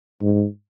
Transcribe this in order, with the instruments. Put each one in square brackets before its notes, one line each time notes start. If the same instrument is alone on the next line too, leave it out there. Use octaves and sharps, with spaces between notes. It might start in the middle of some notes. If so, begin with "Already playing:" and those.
[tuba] G#2